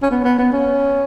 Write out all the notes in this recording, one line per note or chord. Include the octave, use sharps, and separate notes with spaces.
C#4
B3
B3
B3
C#4